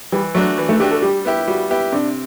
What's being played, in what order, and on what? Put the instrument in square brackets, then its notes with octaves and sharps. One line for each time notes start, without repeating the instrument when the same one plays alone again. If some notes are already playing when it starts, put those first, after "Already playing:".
[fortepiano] E3 [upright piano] G3
[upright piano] F#3 [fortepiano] A3 D4 F#4
[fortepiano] E3
[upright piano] A3
[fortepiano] A3 D4 F#4 [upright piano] G4
[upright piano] A4
[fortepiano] G3 [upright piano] G4
[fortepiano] B3 E4 G4
[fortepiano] G3 [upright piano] F#4
[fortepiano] B3 E4 G4
[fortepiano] C3 [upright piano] D4